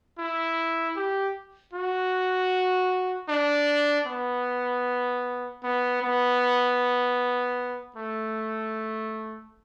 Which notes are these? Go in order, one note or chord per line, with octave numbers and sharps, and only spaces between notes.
E4
G4
F#4
D4
B3
B3
B3
A3